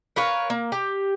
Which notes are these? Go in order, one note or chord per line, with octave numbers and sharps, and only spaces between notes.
A#4 B4 C#5 F5
A#3
G4